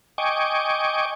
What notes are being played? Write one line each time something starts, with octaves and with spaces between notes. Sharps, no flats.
D#5 G5 G#5 C#6 D6